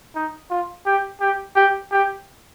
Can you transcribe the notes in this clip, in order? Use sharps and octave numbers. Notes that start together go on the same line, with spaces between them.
D#4
F4
G4
G4
G4
G4